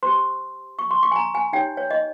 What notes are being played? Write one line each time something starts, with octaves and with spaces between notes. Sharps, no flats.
G4 C5 C6
C#6
C6
C#6
G#5
A#5
G#5
D#4 G4 C#5 G5
C#5
D#5